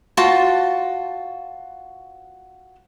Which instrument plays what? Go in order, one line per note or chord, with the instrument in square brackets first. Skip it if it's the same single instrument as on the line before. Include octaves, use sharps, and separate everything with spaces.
[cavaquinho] F4 F#4 C5 A5